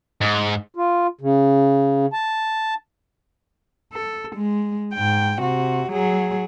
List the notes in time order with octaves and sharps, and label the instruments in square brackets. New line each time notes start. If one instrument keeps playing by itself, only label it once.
[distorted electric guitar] G#2
[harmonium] F4
C#3
A5
[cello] A4
G#3
G#2 G5
C3 F#4
F#3 G#4